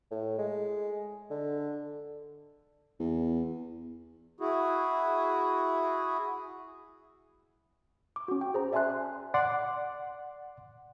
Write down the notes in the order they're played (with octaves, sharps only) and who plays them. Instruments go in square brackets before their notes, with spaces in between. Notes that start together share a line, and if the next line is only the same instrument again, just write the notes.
[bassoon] A2
G#3
D3
[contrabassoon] E2
[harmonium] E4 F#4 G#4
[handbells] D6
C#4 F#4
G5
G#4 C5 A#5
D5 E5 G#5 A5 C6 F#6
[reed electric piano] D5 F#5 C6